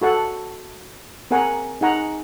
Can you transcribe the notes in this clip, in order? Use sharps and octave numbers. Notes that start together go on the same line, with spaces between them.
F#4 A4 F#5 A5
C4 G#4 A#4 F#5 G#5 A#5
D#4 G#4 F#5 A#5